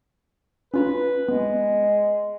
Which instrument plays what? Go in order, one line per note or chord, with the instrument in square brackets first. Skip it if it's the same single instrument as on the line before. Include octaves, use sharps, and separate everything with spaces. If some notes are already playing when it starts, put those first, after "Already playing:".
[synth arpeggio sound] C#4 F4 A#5 [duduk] B4
[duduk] G#3 [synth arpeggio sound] B3